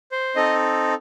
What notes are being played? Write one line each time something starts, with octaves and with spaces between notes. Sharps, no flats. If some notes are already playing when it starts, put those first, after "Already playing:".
C5
C4 D#4 A4 D#5